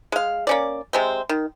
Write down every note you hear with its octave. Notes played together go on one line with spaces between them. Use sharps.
G#3 F5
A#3 C#4 D5
C3 G#3 C4
D#3